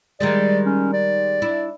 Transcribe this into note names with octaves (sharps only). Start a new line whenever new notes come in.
D#3 G3 G#3 D5
C#4
D5
D4 E4